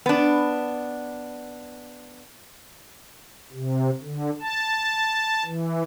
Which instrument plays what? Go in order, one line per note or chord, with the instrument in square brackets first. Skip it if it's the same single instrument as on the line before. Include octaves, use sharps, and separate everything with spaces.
[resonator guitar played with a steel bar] B3 D4
[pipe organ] C3
D3
A5
E3